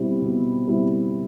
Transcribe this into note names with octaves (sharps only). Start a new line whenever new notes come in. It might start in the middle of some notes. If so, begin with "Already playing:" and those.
Already playing: B2 G3 C4 E4
B2
G3 C4 E4